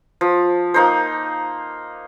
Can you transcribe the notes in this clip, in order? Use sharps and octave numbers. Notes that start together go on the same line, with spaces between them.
F3
A#3 D#4 C5